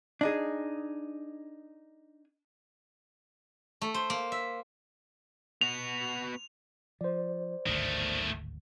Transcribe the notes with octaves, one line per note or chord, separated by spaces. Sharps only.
D4 D#4 G#4
A3
C5
A#3
E5
B3 F#4 F7
F3 C5 D5
D1 G#1 D2 D#3 A3